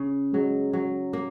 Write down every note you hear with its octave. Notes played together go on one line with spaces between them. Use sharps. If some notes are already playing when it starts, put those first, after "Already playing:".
Already playing: C#3
F#3 G#3
F#3
A#3